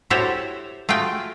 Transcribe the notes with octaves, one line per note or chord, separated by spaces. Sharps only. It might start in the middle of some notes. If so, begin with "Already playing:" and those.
E4 F#4 G4 A4 C5 C#5
A3 F4 F#4 G#4 G5